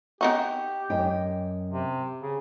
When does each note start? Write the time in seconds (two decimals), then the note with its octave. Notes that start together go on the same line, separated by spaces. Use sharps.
0.21 B3 D#4 F#4 G4
0.90 F#2 D#5 G5
1.70 C3
2.21 C#3